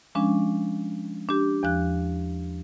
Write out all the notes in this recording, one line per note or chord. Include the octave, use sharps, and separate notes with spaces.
F3 G#3 C#4 D4
D4 G4
E2 F3 F#6